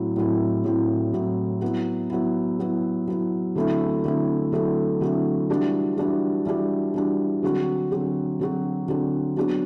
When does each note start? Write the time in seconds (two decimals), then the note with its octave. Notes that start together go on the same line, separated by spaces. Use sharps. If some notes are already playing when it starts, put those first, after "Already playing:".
Already playing: A2 F#3 C4 E4
0.16 A2 F#3 C4 E4
0.65 A2 F#3 C4 E4
1.13 A2 F#3 C4 E4
1.62 F#3 B3 E4
2.10 F#3 B3 E4
2.59 F#3 B3 E4
3.08 F#3 B3 E4
3.55 D3 F#3 A3 C4 E4
4.04 D3 F#3 A3 C4 E4
4.52 D3 F#3 A3 C4 E4
5.01 D3 F#3 A3 C4 E4
5.50 E3 G3 D4 F#4
5.97 E3 G3 D4 F#4
6.46 E3 G3 D4 F#4
6.94 E3 G3 D4 F#4
7.43 D3 F#3 C4 F#4
7.91 D3 F#3 C4 F#4
8.39 D3 F#3 C4 F#4
8.88 D3 F#3 C4 F#4
9.37 F#3 B3 D4 F#4